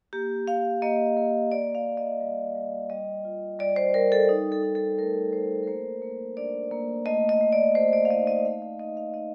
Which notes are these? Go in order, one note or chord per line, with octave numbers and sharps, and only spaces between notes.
A#3 G4
A#3 F5
A#3 D#5
A#3
A#3 D5
F5
A#3
D#5
G3
G3
G3 D#5
F4
G3 D5
C5
G3 A#4
A4
D#4
A4
D#4
A4
A3 A#4
A3 C5
A#4
A#3 C5
A#3
D4 D5
A#3
A3 D#5
D#5
A3
D5
A3 C5
D5
F5
D#4 D#5
D#5
A3 F5
D#5
D#4 D#5
F5
D#4 D#5